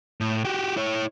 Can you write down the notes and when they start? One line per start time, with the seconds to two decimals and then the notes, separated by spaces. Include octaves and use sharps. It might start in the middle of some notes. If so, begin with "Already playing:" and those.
0.21 A2
0.45 F#4 G4
0.77 E4 C#5